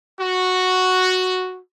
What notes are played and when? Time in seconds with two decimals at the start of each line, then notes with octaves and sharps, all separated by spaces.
0.20 F#4